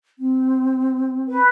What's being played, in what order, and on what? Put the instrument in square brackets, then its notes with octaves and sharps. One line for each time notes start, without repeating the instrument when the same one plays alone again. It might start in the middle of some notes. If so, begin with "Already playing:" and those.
[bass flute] C4
[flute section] B4